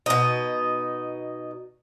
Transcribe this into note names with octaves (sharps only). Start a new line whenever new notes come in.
B2 D#4